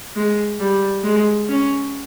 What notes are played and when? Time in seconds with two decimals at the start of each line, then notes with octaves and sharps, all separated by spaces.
0.16 G#3
0.60 G3
1.04 G#3
1.49 C#4